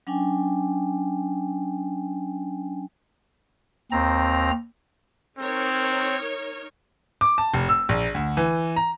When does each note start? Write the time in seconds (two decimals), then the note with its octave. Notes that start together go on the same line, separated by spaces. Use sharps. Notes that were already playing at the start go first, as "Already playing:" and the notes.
0.07 F#3 C#4 D4 G5 G#5
3.92 D#2 C4 A#5
5.39 C4 D#4 A#4 C#5
7.21 D6
7.38 A5
7.54 F1
7.69 E6
7.89 A#1
8.15 D2
8.37 E3
8.76 A#5